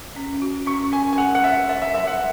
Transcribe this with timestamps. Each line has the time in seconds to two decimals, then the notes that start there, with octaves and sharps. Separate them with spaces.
0.16 C#4
0.42 F#4
0.66 C#4 C#6
0.92 C#4 G#5
1.13 G#5
1.18 G#4 F#5
1.35 F#5
1.44 C#5 E5
1.69 C#5 E5
1.82 E5
1.94 F#3 E5
2.07 F#5